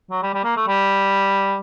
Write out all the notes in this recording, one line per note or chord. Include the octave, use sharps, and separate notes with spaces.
F#3
G3
G3
A#3
A3
G3